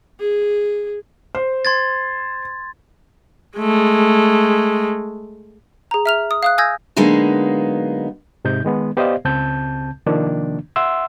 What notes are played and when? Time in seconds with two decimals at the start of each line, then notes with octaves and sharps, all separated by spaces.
0.20 G#4
1.35 C5
1.65 C6 G#6 A6
3.58 G#3 A3
5.91 G#4 A#5
6.06 E5 F6 F7
6.31 D#6
6.43 F5 D#6 F#6
6.58 G#5 D#6 E6 G6 G#6 A#6
6.96 D3 F#3 G#3 A#3 B3 D#4
8.45 G#2 C3 D#4 G6
8.65 D#3 G#3 B3
8.97 B3 G4 C5 D5 D#5 F5
9.25 C#2 C#3 C4 A5 G6
10.06 C3 D#3 F3 A#3 D4
10.76 E5 F#5 C6 E6